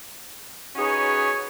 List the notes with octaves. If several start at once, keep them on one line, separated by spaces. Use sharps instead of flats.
C#4 D#4 F#4 G#4 B4 C#5